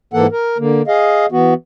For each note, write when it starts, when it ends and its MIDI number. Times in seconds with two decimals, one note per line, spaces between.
0.13 0.27 44
0.13 0.27 52
0.13 0.27 58
0.13 0.27 69
0.13 0.27 78
0.32 0.58 70
0.58 0.82 50
0.58 0.82 58
0.87 1.26 68
0.87 1.26 75
0.87 1.26 77
1.32 1.54 52
1.32 1.54 59
1.32 1.54 66